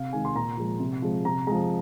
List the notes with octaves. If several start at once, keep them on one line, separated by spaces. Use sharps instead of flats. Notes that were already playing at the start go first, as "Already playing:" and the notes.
Already playing: C3 F5
D#3 G#3 G#5
C6
A#2 A#5
F3 G#3
C3
F3 G#3
C3 A#5
F3 G#3 A#5